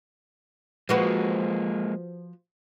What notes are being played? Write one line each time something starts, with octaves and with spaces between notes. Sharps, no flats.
F3 G#3 A#3 F#4 B4